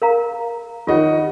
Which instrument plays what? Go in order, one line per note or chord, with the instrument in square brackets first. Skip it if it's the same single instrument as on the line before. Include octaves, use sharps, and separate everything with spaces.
[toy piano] A#4 F5 A#5
[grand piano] D#3 D#5 F#5 [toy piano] F4 G4 C#5